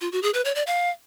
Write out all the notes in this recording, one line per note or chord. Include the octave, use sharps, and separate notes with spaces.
F4
F#4
G#4
B4
C#5
D5
F5